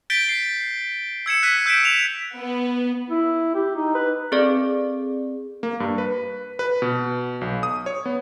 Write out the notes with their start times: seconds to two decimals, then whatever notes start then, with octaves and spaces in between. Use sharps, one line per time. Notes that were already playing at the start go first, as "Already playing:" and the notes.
0.10 G6 A6 B6 D7 G7
0.29 C7
1.26 E6 G#6 C#7 E7
1.43 F#6 B6 D#7
1.66 E6 G6 B6 D7 E7
1.85 E7 F7
2.36 B3
3.10 E4
3.54 G4
3.76 D#4
3.95 B4
4.32 C4 G#4 A4 D5
5.63 A#3
5.80 G2
5.98 B4
6.59 B4
6.82 B2
7.41 B1
7.63 D#6
7.86 C#5
8.06 B3